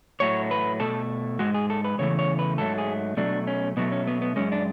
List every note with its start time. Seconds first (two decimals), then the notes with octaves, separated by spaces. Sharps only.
0.20 A2 F#3 A3 C#5
0.51 B4
0.80 B2 A3 A4
1.39 G#2 G#3 F#4
1.55 G#4
1.70 A4
1.84 B4
1.98 E2 C#3 E3 A3 C#5
2.19 C#5
2.39 B4
2.58 G#2 F#3 A3 A4
2.78 G#4
3.17 B2 F#3 A3 D4
3.47 C#4
3.77 B2 F#3 A3 B3
3.92 C#4
4.07 B3
4.22 B3
4.36 F#2 D3 G#3 C#4
4.52 D4